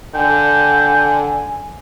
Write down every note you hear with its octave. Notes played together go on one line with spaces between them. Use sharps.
D3 G5 G#5